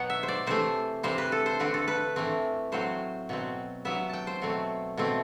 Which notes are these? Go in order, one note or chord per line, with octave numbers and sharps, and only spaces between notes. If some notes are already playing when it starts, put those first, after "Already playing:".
Already playing: B2 F#3 B3 F#5
E5
C5
D5
C3 E3 A3 C5
C3 E3 G3 C4 C5
B4
A4
C5
D3 A3 C4 B4
A4
B4
A2 E3 A3 C4
A2 F#3 C4 C5
B2 F#3 C4
C3 F#3 B3 E5
G5 A5
C5
B2 F#3 A3 C4
B2 A3 C4